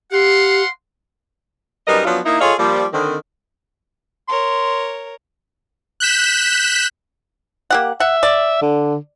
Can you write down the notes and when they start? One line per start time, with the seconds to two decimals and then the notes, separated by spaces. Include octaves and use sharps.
0.12 G4 F5 F#5 C6
1.87 F#2 G3 D#4 A#4 B4 D#5
2.05 F3 F#3 B3 C#4 D4 F4
2.25 A#3 D#4 E4
2.41 F4 G#4 A4 C#5 D#5 F5
2.59 F3 G3 A#3
2.93 D3 D#3 C4
4.28 A#4 C#5 C6
6.00 F#6 G6 B6 E7
7.70 A#3 G4 F#5
8.00 E5 F#5
8.23 D5
8.62 D3